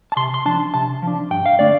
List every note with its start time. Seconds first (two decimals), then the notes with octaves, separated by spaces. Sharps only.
0.12 A5
0.17 C3 C6
0.34 C6
0.45 F3 D4 A5
0.74 C3 A5
1.02 F3 D4
1.31 G2 G5
1.46 F5
1.59 D3 A3 D4 D5